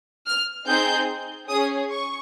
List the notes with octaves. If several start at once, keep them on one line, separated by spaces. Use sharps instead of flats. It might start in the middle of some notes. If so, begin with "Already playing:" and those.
F6
C4 D#4 G#4 G6
C#4 G#4 D#6
C#6